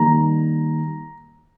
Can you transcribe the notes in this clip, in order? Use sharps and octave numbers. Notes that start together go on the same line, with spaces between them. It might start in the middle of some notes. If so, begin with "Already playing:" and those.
Already playing: D#3 G3 A#3 A#5